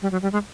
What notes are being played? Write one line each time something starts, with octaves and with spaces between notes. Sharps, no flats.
G3
F#3
G3
G#3